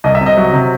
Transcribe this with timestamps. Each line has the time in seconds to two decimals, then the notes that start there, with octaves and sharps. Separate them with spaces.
0.04 C2 D#5
0.15 E5
0.21 C3
0.26 D#5
0.37 F#3
0.53 C3